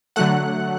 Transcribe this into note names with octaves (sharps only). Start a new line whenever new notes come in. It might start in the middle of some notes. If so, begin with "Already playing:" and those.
D3 F#3 A3 F#5 F#6